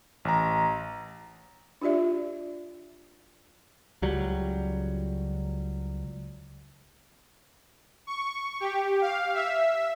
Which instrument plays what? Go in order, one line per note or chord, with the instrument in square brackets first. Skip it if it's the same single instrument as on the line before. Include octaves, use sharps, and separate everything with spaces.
[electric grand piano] A1 A#5
[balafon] D4 F4 G4 D5 E5
[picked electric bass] C#2 F#3 G3
[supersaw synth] C#6
G4
F5
E5